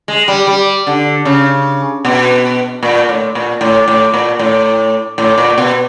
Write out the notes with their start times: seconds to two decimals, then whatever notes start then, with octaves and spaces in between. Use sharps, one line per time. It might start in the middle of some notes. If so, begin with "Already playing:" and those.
0.08 G#3
0.28 G3
0.47 G3
0.87 D3
1.25 C#3
2.05 B2
2.83 A#2
3.09 A2
3.35 A#2
3.61 A2
3.88 A2
4.14 A#2
4.39 A2
5.18 A2
5.38 A#2
5.58 B2